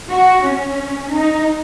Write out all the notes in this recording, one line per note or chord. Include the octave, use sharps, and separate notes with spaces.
F#4
C#4
D#4